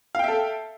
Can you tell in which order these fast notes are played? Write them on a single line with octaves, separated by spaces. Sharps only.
F5 G5 E5 A4